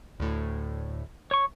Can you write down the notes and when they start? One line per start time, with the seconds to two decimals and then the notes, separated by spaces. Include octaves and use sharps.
0.20 D2 A2
1.31 C#5 C#6